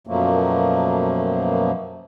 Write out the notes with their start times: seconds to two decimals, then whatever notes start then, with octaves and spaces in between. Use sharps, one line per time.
0.07 F#2 B2 F3 F#3 A3 A#3